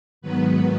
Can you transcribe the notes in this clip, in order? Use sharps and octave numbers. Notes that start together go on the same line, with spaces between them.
G#2 D#3 F#3 B3 B4